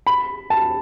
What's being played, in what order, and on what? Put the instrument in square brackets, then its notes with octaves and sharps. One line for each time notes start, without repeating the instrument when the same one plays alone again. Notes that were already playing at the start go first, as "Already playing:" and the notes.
[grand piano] B5
A5